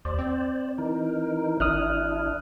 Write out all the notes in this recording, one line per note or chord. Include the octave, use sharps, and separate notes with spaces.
D#2 C5 D5
C4
E3 D#4 A#4
G#1 D4 E4 D#6 F6 F#6